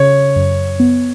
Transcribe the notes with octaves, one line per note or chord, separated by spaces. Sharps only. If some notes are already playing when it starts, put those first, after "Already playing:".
Already playing: C#3 C#5
F#2
B3